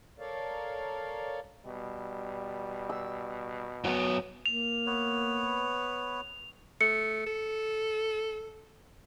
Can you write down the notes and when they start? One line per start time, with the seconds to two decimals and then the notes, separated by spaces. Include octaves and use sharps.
0.19 A4 A#4 C#5 D5 F5
1.66 B2 G3
2.89 E6
3.84 F#2 F#3 B3
4.46 A#3 F7
4.86 B3 B4 C#5
6.81 A3 C#7
7.26 A4